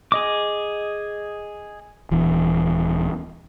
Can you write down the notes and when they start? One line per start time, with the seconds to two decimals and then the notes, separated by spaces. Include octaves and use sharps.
0.12 G#4 D#5 D6
2.11 D#1 E3